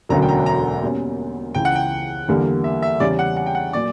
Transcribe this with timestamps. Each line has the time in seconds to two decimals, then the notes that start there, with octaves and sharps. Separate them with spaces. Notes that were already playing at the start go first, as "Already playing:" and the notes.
0.09 E1 D2 D3 F#3 C#4 A#5
0.22 G5
0.28 A#5
0.46 A#5
0.83 B2 G3 A#3 C#4
1.55 C#2 C#3 E3 G5
1.65 F#5
1.75 G5
2.28 E2 D3 G3 A#3
2.64 E5
2.82 E5
3.00 E2 C#3 G3 C#4 D5
3.19 F#5
3.37 F#5
3.46 G5
3.55 F#5
3.73 A#2 F#3 D5